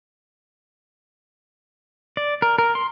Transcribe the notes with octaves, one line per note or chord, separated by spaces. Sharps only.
D5
A#4
A#4
C6